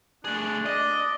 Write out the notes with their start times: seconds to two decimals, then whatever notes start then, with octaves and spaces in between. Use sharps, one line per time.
0.25 A3 D4 G#4
0.66 D5 D#5